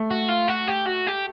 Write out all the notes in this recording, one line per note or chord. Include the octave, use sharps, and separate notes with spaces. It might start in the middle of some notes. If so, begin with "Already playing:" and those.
Already playing: A3
F#4
F4
F#4
G4
F#4
G4